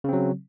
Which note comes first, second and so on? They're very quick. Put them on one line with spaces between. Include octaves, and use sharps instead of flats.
C#3 C4 F#3